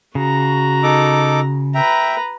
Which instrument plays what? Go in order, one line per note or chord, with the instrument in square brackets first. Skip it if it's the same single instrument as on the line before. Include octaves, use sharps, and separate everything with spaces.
[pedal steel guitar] C#3 [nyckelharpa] F#4 A#5
[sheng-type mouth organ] D#4 A4 D6
[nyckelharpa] B4 A#5 [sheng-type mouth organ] E5 G5